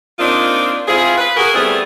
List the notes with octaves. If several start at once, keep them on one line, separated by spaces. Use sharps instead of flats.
A#3 C4 D4 D#4 F4
C4 E4 F4 G#4
B4
F#4 G#4 A#4
G3 A3 B3 C4 E4 G#4